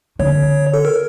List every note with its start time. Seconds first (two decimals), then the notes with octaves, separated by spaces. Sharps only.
0.19 D3 C#5
0.74 A4
0.85 A#4